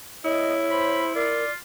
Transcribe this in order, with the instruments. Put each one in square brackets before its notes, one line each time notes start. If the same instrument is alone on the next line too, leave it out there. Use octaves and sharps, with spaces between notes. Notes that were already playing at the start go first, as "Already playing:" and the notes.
[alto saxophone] E4 [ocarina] C#5 [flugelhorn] D#5
[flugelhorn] C5 [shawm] B5
[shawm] F4 [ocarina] A#4 [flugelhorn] D5